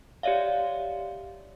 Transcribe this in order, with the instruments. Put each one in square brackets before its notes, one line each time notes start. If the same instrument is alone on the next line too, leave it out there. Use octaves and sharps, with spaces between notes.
[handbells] G4 C#5 D5 E5 F5